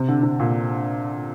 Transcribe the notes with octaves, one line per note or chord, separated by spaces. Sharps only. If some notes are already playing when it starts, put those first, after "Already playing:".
Already playing: C3
D3
C3
A#2